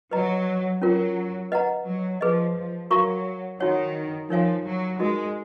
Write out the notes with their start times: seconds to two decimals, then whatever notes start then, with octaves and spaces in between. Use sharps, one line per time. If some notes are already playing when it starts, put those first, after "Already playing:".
0.11 F#3 B4 D#5 A#5
0.81 F#3 C#4 F4 A#4
1.52 B4 D#5 F#5 A#5
1.86 F#3
2.21 F3 G#4 B4 D#5
2.56 F3
2.91 F#3 F#4 A#4 F5 A#5 C#6
3.60 D#3 D#4 F#4 C#5 F#5
4.29 F3 D#4 A#4 C#5 F5 G#5
4.65 F#3
4.99 G#3 D#4 F#4 A#4 D#5